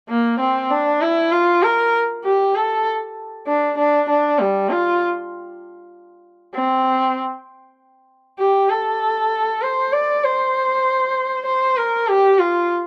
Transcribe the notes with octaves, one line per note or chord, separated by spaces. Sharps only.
A#3
C4
D4
E4
F4
A#4
G4
A4
D4
D4
D4
G3
F4
C4
G4
A4
C5
D5
C5
C5
A#4
G4
F4